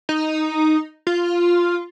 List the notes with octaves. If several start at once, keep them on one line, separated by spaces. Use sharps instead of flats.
D#4
F4